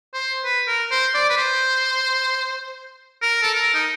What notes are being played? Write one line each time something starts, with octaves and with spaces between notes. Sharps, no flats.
C5
B4
A#4
C5
D5
B4
C5
A#4
A4
A#4
D#4